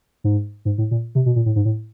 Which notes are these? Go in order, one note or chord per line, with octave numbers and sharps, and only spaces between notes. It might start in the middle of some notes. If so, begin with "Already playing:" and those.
G#2
G#2
A2
A#2
C3
B2
A#2
A2
G#2
A2